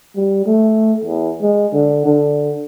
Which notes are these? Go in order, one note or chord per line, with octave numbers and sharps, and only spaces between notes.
G3
A3
E2
G#3
D3
D3